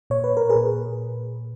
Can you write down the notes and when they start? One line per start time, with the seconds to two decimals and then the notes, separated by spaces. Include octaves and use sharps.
0.10 A#2 C#5
0.24 B4
0.37 A#4
0.49 G#4 B4
0.56 A#2